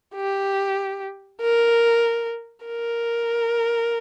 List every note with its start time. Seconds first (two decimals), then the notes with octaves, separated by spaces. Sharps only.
0.15 G4
1.41 A#4
2.65 A#4